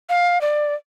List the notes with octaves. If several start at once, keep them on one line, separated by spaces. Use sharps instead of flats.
F5
D5